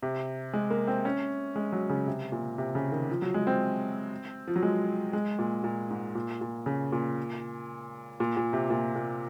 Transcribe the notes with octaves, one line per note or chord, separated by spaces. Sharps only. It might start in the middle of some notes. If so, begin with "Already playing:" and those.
C3
G#3
A#3
C4
C#4
G#3
F#3
C#3
C3
A#2
C3
C#3
D#3
F3
F#3
G#3
C4
F3
F#3
G#3
G#3
A#2
A#2
G#2
A#2
A#2
C#3
A#2
A#2
A#2
C3
A#2
A#2